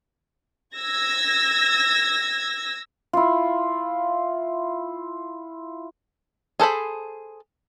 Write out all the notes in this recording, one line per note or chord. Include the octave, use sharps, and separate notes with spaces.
E6 G#6 A#6
E4 F4
G#4 A4 C5 B5